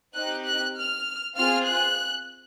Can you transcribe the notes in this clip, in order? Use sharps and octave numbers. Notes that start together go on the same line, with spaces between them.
C4 D#4 G4 F#6
F#6
F6
C4 F4 G#4 F6
F#6